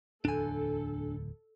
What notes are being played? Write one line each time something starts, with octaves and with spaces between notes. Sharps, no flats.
D1 E2 D4 A4 G#5